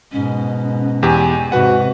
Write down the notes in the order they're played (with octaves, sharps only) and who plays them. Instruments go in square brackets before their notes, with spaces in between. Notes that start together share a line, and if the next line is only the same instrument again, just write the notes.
[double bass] G#2 B2 [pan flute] C#4
[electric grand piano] E2 G4 [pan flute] G#5
[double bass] G#2 C3 [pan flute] F#4 [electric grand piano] B4 F#5